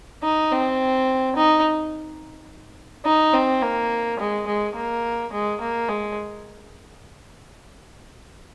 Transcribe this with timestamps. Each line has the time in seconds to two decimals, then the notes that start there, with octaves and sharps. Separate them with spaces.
0.23 D#4
0.52 C4
1.36 D#4
3.06 D#4
3.34 C4
3.62 A#3
4.20 G#3
4.47 G#3
4.76 A#3
5.32 G#3
5.61 A#3
5.88 G#3